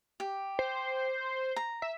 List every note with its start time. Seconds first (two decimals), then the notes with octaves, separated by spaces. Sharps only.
0.20 G4
0.59 C5
1.56 A#5
1.82 E5